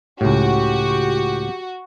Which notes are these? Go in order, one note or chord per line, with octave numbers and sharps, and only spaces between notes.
C#2 A2 F#4 G4